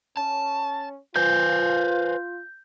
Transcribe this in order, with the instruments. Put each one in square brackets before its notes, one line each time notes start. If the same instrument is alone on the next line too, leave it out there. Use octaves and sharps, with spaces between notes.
[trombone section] C#4 [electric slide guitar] A5
[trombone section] F4 [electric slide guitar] B4 C5 G#5 [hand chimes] G6